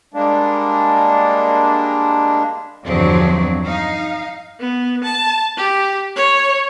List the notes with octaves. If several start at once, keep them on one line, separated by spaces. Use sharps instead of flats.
G3 G#3 A#3 D4
E2 G2 D3 F3 F#3 C4
D#4 F5
B3
A5
G4
C#5